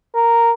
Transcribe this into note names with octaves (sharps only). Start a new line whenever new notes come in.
A#4